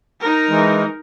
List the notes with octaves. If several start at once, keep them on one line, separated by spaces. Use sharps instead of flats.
D#4 A#4
E3 G#3